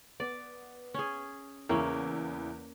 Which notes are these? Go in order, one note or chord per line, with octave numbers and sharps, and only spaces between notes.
B3 D5
C#4 G#4
E2 C#3 A#3 C#4 E4